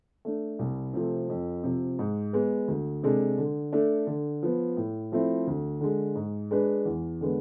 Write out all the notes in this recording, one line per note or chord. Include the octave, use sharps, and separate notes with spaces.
A3 D4
C2
C3 F3 A3 C4
F2
C3 F3
G#2
G#3 B3
D2
C3 G#3 D4 A4
D3
A3 D4 A4
D3
F3 B3
A2
F3 A3 C4 E4
D2
D3 G#3
G#2
G#3 D4 G#4 B4
E2
D3 G#3 B3